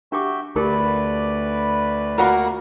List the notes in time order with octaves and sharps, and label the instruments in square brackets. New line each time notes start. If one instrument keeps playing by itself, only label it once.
[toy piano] D4 G4 D6 [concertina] F#4 E5 G5
[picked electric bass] D2 [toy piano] D#4 G4 A#4 [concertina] B4 D5 B5
[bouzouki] A#3 F#4 A#4 [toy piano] F4